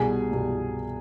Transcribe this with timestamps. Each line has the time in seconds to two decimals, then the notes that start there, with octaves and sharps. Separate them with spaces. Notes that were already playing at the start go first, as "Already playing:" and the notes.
Already playing: C2 B2 G3 G#4 G#5
0.32 C2 B2 G3